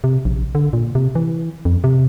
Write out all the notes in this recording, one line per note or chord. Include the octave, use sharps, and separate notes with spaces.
C3
A#1
D3
A#2
C3
E3
F2
C3